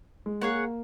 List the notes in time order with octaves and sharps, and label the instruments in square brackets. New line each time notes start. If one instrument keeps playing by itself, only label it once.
[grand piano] G#3
[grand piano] A#3 [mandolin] G#4 C#5 F#5